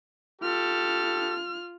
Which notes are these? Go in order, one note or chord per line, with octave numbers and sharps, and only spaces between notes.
F4 G4 A4 F6